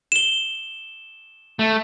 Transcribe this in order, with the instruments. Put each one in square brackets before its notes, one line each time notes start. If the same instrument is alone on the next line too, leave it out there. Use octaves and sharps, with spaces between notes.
[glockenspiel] E7 G7
[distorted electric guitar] A3